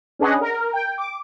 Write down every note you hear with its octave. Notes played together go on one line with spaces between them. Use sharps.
C#4 D4 G#4 B4 D#5 F#5
A#4
G5
D6